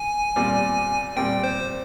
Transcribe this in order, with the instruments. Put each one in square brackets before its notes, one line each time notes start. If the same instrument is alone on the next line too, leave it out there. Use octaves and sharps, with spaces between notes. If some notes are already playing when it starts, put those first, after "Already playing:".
Already playing: [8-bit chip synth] G#5
[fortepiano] A#2 G3 C4
[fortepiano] A#2 G3 C4 [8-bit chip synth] G5
[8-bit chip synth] C5